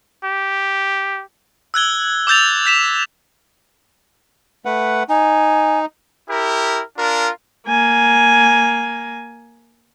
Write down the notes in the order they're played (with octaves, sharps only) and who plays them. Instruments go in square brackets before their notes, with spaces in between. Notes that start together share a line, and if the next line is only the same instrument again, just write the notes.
[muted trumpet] G4
[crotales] E6 F#6 G#6 G7
D6 E6 G6 A6 F7
G6 B6 E7 F7
[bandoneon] A3 B4 F#5
[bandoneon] D#4 [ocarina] G#5
[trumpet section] E4 G4 A#4
D4 F4 A#4
[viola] A#3 G#5